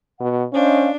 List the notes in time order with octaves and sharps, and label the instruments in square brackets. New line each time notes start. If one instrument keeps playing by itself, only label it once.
[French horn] B2 [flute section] F#5
[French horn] C#4 [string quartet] D4 [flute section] C5 D#5 F5